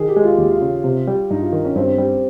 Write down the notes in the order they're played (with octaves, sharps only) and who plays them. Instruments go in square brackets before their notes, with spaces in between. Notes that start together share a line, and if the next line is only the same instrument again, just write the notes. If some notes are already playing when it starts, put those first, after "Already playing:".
Already playing: [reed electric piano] D#3 [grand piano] G#4
[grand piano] G4
[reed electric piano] G#3
[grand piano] F4
[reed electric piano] D#2 [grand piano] G4
[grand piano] F4
[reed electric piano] C#3
C3
G3
[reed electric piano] G2 [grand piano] D#4
[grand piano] F4
[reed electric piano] D#3
[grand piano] C#4
[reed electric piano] G2 [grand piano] C4
[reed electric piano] G3